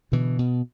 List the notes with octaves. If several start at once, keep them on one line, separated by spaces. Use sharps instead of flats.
B2 D3 E3
B2